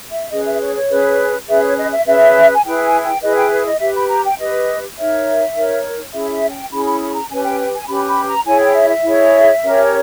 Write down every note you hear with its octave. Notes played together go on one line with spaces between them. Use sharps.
E5
C#4 G#4 B4 D#5
E5
C#5
C#5
C#4 G#4 B4
C#4 G#4 B4 E5
C#5
D#5
E5
C#4 G#4 B4 E5
G#5
E4 G#4 B4 G5
G#5
G5
E4 G#4 B4 D#5
G5
D#5
G4 B4 E5
B5
A#5
G5
G4 B4 D#5
D#4 A#4 C#5 E5
D#4 A#4 C#5
C#4 E4 G#4 E5
E5
G5
C#4 E4 G#4 B5
B5
B5
A#5
C#4 G4 B4 G#5
G5
G5
G#5
C#4 G4 B4 B5
B5
A#5
E4 G#4 C#5 G#5
G5
E5
E5
E4 G#4 C#5
C#4 G4 A#4 C#5